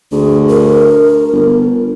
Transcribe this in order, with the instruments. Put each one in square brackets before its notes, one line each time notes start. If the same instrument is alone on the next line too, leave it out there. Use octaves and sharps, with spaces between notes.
[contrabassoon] D2 [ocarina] G#4
[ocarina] A#4
[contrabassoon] G1